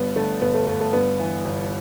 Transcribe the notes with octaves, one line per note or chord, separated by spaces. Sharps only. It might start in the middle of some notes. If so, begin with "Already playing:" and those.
Already playing: G1 G2 B3
D3 A3
G1 B3
A3
G1 A3
A3
G2 B3
E3
G1